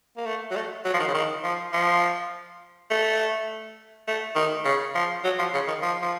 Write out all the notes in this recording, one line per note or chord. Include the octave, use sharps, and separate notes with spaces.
A#3
A3
F#3
A3
F#3
F3
D#3
C#3
D#3
F3
F3
A3
A3
D#3
C#3
F3
F#3
F3
C#3
D#3
F3
F3